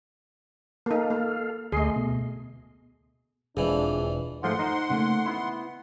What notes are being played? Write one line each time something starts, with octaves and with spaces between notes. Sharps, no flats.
A#3 D#4 A4 F5
A#3
D2 A3 G#4 D#5 C6
B2
E1 F2 E3 G#3 D4 F4 G#4
G#2 F3 A3 F#5 C6
D#4 C5
C#3 A3 A#3
B3 E4